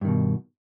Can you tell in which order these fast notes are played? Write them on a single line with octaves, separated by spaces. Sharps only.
G2 D#3 B2